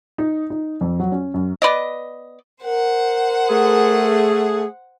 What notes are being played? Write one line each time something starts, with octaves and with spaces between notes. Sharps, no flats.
D#4
D#4
F2
F#3
C#4
F#2
B3 B4 D5 D#5
A#4 C5 F#5
A3 G#4